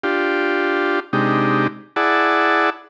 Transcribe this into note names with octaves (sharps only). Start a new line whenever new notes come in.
D4 F4 G4
C3 G#3 D4 D#4 G4
E4 G#4 D5 F#5 A5